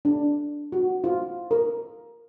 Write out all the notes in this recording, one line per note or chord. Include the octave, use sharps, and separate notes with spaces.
D4
F#4
F4
A#4